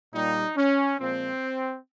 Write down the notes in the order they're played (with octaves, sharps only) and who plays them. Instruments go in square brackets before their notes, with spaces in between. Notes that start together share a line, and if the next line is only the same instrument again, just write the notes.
[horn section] A#2 G3 D#4
C#4
A#2 F3 G#3 C4